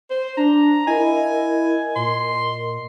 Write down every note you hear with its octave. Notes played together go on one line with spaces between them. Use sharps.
C5
D4 A#5
E4 A#4 D#5 G#5
A#2 C6